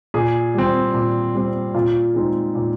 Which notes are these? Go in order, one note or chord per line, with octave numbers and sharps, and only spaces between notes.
A#2 G#4
G3 C4
A#2
G3 C4
A#2 F4
G#3 C4 D#4
A#2